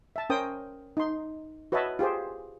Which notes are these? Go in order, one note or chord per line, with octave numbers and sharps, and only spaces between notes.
E5 A5
C#4 A#4 C5 G5 D#6
D#4 C6
F#4 B4 C#5 D#5 E5 A5
F4 G4 G#4 C5